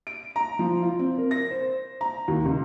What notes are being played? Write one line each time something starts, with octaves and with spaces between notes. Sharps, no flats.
D7
A#5
F3
F4
C4
A#4
A#6
C5
A#5
D#2
C#2